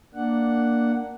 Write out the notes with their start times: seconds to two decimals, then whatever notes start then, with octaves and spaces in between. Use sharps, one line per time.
0.15 A#3 D4 F#5